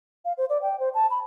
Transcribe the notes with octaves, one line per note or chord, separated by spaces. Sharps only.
F5
C5
D5
G5
C5
A5
B5